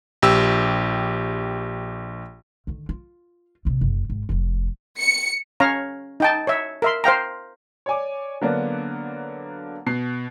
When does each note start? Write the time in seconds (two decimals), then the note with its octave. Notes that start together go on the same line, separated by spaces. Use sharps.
0.22 A#1 G4 E6
2.67 D3 D#3
2.89 F4
3.65 A#1 C3
3.81 F#1
4.10 G#1
4.29 F1 F2
5.01 C#7
5.60 C#4 C#5 F5 A#5
6.20 D#4 G5 A5
6.47 C#5 E5
6.82 A#4 E5 C6
7.04 C5 F5 G5 A#5
7.86 C#5 D5 G#5 D6
8.41 D3 F#3 A#3 B3 D4
9.86 B2 C7